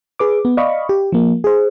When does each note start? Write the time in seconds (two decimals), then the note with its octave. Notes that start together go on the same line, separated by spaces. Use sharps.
0.19 G#4 B4 D6
0.45 B3
0.57 D5 D#5 F5 B5 C#6
0.89 G4
1.12 F3 A#3
1.44 G#4 C5